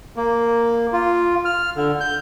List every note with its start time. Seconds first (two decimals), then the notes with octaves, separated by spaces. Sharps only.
0.16 A#3
0.93 F4
1.45 F6
1.76 D3
2.00 G6